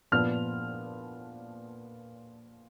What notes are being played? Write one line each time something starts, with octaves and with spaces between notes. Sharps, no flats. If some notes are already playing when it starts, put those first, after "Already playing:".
A#2 F3 B3 D4 F6